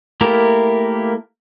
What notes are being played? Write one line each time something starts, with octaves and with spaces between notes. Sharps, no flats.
A3 A#3 E4 G4 A#4